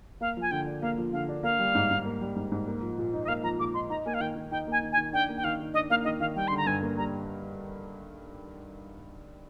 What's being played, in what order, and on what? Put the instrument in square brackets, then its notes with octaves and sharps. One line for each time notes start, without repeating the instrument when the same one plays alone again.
[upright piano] A#3 [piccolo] F5
[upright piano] F3 [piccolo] G#5
[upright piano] D3 [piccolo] G5
[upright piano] D4
[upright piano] A#3 [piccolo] F5
[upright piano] F3
[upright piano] D3 [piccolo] F5
[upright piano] D4
[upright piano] A#3 [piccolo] F5
[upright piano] G3
G#2
G#2
A#3
G3
G#2
G#2
A#3
F3
A#2
D#4
[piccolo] D#5
[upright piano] A#3 [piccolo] F5
[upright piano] F3 [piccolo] A#5
[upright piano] A#2 [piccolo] D6
[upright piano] D#4 [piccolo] C6
[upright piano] D#4 [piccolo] A#5
[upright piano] A#3 [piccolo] G#5
[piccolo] F5
[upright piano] D#3 [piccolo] G5
[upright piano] D#3
[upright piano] D#4 [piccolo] G5
[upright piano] A#3 [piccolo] G#5
[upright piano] D#3
[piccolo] G#5
[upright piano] D#3
[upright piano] D4 [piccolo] G5
[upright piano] A#3
[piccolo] G5
[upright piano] D#3 [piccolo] F5
[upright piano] D#3
[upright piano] D4 [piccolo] D#5
[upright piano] A#3 [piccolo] F5
[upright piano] D#3 [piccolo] D#5
[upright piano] D#3 [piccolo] F5
[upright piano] G3 [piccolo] G5
[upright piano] D3 [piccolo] C6
[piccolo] A#5
[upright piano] G2 [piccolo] G#5
[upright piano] A#3
[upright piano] G3 [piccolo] A#5